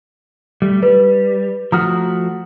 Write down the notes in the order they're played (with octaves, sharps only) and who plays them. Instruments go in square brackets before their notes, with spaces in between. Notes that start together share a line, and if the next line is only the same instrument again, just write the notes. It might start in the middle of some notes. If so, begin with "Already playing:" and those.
[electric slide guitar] G3 A3
[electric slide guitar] G3 [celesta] B4
[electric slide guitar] F3 A3 F#4 [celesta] A#5 D#6 F6